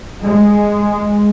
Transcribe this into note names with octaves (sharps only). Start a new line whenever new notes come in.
G#3